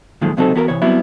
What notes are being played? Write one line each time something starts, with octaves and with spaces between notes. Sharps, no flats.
F#2 A#2 D3 D#3 F3 G#3
C#2 C3 F#3 C4 D#4 A4
E2 B3 F#4 A4 A#4
C3 E3 C#5
F#3 G3 B3 C4 E4 F#4